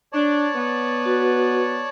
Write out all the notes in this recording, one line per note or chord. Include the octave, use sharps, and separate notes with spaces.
D4 C#5 D5 A5
B3
F#4 B4